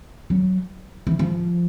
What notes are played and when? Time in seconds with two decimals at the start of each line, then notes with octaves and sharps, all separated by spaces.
0.30 F#3
1.07 E3
1.19 F3